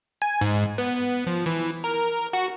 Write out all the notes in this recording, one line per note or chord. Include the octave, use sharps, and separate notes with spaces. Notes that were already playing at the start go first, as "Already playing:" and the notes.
G#5
G#2
B3
F3
E3
A#4
F#4